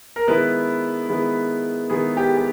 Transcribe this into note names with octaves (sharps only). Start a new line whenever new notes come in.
A#4
D#3 G#3 B3 E4 B4
D#3 G#3 B3 E4
D#3 G#3 B3 E4 G#4
G4
G4